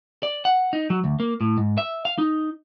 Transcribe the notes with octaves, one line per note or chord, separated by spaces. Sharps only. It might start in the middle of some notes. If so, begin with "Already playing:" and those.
D5
F#5
D#4
F#3
D2
A#3
A2
G#2
E5
F5
D#4